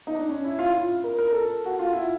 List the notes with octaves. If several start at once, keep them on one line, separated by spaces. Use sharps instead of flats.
D#4
D4
C#4
E4
F4
A#4
A#4
A4
F#4
F4
E4